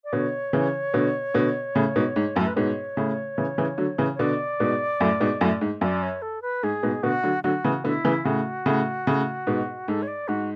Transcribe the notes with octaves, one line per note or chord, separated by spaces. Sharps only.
D5
B2 D3 C#5
C#3 E3
B2 D3
B2 D3
A2 C#3
G#2 B2
G#2
F#2 A2 A4
B4
G#2 B2 C#5
A2 C#3
C#3 E3
C#3 E3
D3 F#3
C#3 E3
C#5
B2 D3 D5
G#2 B2
F#2 A2
G#2 B2
F#2 A2
G#2
F#2 D5
C#5
A4
B4
G#2 G#4
G#2 B2
B2 D3 F#4
D3 F#3
D3 F#3 F#4
C#3 E3
B2 D3 E4
C#3 E3
A2 C#3 F#4
A2 C#3
A2 C#3
G#2 B2
G#2 A4
C#5
D5
G#2 F#4